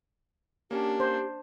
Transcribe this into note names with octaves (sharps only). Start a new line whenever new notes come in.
A#3 C#4 D4 G4
C5